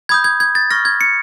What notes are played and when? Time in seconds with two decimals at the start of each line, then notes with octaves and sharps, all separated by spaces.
0.09 B5 D#6 G6 G#6
0.24 G#6
0.40 G#6
0.55 A6
0.71 C#6 F6 A#6
0.85 G#6
1.01 C#7